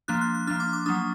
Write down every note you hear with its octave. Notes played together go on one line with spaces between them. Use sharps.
F3 A#3 D4 F#6
F#6
F#6
F3 A#3 D4 F6
D6
D6
F#3 A#3 D4 D#6